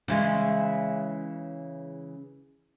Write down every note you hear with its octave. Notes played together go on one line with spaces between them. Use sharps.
C#3 E3 G#3